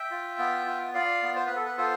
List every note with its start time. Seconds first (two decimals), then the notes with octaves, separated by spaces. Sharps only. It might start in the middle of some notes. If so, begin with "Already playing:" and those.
Already playing: E5 G5
0.11 F4
0.39 B3
0.66 F4
0.94 F4 D5 F5
1.23 B3
1.36 C5
1.47 B3 B4
1.56 A4
1.65 B4
1.77 F4 A4 C5